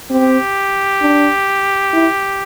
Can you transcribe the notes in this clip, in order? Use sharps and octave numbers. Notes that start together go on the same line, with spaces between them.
C4 G4
D4
E4